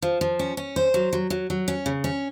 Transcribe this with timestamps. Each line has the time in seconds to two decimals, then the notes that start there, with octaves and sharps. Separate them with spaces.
0.02 F3
0.21 F3
0.39 C#4
0.57 C#4
0.76 C5
0.94 F#3
1.13 F#3
1.30 F#3
1.50 F#3
1.68 C#4
1.86 C#3
2.04 C#4